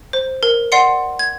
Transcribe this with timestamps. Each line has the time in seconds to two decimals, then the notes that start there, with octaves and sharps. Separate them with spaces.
0.13 C5
0.43 A#4
0.72 D5 F#5 C6 C7 C#7
1.19 G#6